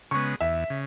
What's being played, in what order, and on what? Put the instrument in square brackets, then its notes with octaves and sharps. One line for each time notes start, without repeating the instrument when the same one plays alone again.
[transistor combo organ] C#3 G#3 B3 [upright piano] C#6
[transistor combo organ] E2 [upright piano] E5
[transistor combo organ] C#3